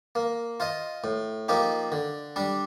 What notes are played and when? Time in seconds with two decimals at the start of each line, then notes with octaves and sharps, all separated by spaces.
0.15 A#3
0.60 F4 C5 D#5
1.04 A2
1.49 F3 A#3 D#4 G4
1.92 D3
2.36 G3 D4